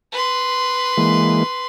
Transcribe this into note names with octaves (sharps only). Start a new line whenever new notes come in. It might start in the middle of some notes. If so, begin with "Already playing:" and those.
B4 C6
E3 G#3 A#3